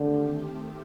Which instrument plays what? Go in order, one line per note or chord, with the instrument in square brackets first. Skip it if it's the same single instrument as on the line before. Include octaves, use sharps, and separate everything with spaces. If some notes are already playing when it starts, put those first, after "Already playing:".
Already playing: [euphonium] D3 [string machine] D#3 A3 C4 G4